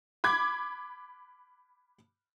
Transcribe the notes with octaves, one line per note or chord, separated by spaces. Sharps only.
B5 D6 G#6